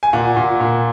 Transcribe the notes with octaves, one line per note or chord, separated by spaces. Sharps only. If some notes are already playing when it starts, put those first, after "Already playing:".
G#5
A#2 F#5
A#2
A#2